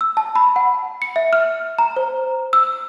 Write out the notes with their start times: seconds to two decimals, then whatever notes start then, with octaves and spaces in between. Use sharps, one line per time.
0.01 E6
0.17 A5
0.36 B5
0.56 F#5
1.02 C#7
1.16 E5
1.33 F6
1.78 A#5
1.96 C5
2.53 E6